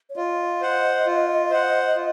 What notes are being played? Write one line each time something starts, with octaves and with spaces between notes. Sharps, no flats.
C#5
F4 D#5
C5 F#5
F4
C5 F#5
F4